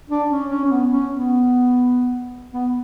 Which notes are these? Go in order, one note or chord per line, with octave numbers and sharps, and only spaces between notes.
D4
C#4
C#4
C#4
B3
C#4
B3
B3